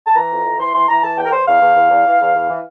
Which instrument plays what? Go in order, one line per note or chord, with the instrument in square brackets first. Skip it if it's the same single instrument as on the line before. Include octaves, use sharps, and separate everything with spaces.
[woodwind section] A5
E3 A#5
F2
E3
E3 C6
E3 C6
E3 A#5
E3 A5
E2 G5
A#4
E2 C5
E2 F5
E2
E2
E2
E3
E2
E2
E3